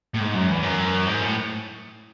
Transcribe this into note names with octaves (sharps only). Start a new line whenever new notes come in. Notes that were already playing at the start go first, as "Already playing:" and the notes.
A2
G#2
F#2
E2
F#2
G#2
A2